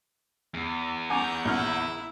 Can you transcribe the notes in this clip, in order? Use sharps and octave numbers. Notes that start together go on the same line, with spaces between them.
E2
F#5 G#5 A#5 C#6 D6 G6
A#1 E4 E5 F6